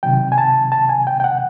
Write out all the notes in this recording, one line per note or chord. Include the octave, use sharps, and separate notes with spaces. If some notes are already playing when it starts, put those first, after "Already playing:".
C3 D#3 F#3 G5
G#5
A5
A5
G#5
G5
G5
F#5